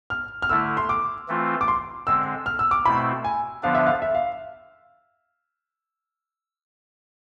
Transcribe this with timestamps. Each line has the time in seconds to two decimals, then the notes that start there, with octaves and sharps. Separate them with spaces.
0.10 F6
0.42 F6
0.49 D3 A3 E4 E6
0.77 C6
0.89 D6
1.28 E3 A3 C4 F4
1.61 D6
1.68 C6
2.07 D3 G#3 C4 E6
2.46 F6
2.59 E6
2.71 D6
2.85 B2 A3 C4 E4 B5
3.24 G#5
3.63 D3 F3 B3 D4 F5
3.75 E5
3.86 F5
4.02 E5
4.15 F5